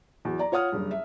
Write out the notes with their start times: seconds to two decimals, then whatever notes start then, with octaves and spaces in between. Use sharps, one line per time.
0.25 E2 F#3
0.39 D5 A#5
0.52 F4 C#5 F#5 D#6 F6
0.72 F#1 G2
0.91 E5